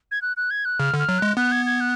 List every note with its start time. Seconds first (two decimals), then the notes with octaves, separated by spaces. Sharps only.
0.11 G#6
0.22 F#6
0.37 F#6
0.51 G#6
0.65 F#6
0.79 C#3 F6
0.94 D3
0.99 F6
1.09 F#3
1.19 G#3 F#6
1.37 B3 F#6
1.52 G#6
1.66 G#6
1.81 F#6